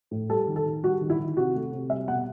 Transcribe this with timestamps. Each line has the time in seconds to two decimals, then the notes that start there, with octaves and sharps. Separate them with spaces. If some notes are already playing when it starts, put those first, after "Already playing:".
0.11 A2
0.30 G3 A4
0.47 D#3
0.56 A4
0.66 D#3
0.84 G3 F#4
1.01 D#3
1.10 E4
1.19 D#3
1.37 C3 F#4
1.55 A3
1.73 C3
1.90 G3 E5
2.08 B2 F#5